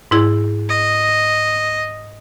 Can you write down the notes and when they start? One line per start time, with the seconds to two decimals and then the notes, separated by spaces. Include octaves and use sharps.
0.11 G#2 E4 G#4
0.69 D#5